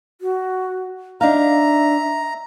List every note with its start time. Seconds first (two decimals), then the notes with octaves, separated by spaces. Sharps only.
0.21 F#4
1.21 D4 D#4 E5 F5 A#5